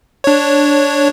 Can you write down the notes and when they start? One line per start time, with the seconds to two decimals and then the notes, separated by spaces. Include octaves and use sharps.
0.24 D4 C#5